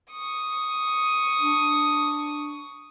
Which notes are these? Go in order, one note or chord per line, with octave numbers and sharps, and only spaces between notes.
C#6 D#6
D4